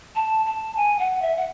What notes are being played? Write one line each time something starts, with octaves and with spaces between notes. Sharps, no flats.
A5
A5
G#5
F#5
E5
F#5